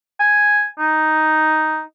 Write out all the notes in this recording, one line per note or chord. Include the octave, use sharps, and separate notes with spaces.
G#5
D#4